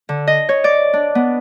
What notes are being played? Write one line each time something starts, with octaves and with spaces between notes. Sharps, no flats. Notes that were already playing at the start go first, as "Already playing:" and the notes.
D3
D#5
C#5
D5
D4
B3